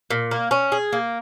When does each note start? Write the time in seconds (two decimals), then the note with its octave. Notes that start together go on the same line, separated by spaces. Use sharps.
0.10 A#2
0.31 A#3
0.51 C#4
0.72 G#4
0.93 A#3